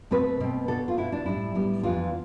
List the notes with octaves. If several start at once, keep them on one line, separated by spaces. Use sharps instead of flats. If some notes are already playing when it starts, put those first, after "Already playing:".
B2 A3 C4 B4
B2 A3 C4
B2 B3 D4 A4
F4
B2 B3 D4 E4
D4
A2 G3 B3 D4 E4
A2 G3 B3 D4
F2 E3 B3 D4 F4